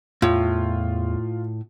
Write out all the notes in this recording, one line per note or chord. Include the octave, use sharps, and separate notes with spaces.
E2 A2 F4